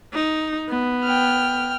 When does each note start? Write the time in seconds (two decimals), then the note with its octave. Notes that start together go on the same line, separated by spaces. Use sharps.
0.14 D#4
0.69 B3
1.04 G5 F6